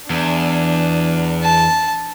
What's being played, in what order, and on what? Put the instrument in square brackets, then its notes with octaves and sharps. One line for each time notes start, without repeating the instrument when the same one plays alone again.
[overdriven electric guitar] E2 [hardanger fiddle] D4
[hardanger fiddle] A5